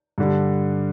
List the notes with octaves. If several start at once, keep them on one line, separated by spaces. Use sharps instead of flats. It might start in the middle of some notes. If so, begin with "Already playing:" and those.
G2 D3 G3